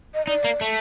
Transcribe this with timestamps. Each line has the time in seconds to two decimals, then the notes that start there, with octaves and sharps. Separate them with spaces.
0.14 D#5
0.27 D#4 D5
0.44 A#3
0.61 A3